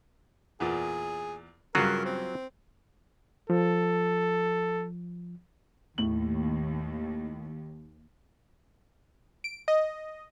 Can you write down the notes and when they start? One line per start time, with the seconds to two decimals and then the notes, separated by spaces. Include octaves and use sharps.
0.60 E2 A#2 G#4
1.75 G2 C#3 F#3 F4 F#4 A#4
2.05 C4
3.50 F3 A4
5.98 D#2 A2 F#7
9.44 D7
9.68 D#5